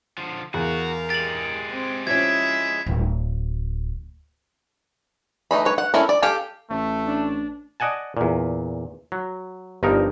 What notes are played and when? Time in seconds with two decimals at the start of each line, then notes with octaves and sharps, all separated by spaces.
0.18 D3 F3
0.54 E2 F#4 A#4 F5
1.10 G#3 G4 A6 F#7
1.71 C4
2.07 F3 C#4 E4 E5 G#6
2.86 D1
5.51 E3 A3 D#4 B5
5.65 B4 C#5
5.78 F#5
5.94 C#4 E4 A4 A#4
6.09 D5
6.22 G4 A4 F5 G5 G#5
6.70 A1 A3
7.06 D4
7.80 D5 D#5 F#5 G#5 A5
8.17 E2 A#2
9.12 F#3
9.83 G1 G2 F3 D#4 A#4